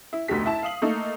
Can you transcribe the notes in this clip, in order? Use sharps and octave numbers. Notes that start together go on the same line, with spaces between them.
E4
F1 D2 B2 G4 B6
E4 A5
F5 D#6 F#7
A3 A#3 D#4 A4